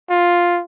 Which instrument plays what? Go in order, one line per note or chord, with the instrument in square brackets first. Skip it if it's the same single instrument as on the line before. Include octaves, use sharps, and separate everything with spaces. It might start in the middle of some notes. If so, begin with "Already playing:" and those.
[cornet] F4